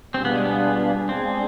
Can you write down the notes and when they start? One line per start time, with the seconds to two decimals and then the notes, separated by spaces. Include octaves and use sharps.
0.14 B2 G3 C4 D4 F4 G#4
0.25 B3
0.36 G#3
0.45 B3
1.09 G#3 C4 D4 G#4